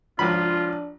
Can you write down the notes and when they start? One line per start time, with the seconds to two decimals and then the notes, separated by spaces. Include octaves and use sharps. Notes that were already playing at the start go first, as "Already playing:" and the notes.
0.19 G#1 C#2 F3 D4 F4 B5